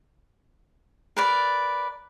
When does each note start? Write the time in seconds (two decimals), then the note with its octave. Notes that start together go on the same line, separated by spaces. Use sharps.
1.17 A#4 B4 D5